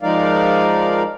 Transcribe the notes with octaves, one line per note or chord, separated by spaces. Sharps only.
F3 G#3 D#4 A#4 D5 F5